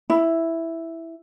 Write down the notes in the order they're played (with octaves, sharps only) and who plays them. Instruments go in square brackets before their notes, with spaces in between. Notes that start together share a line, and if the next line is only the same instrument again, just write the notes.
[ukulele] E4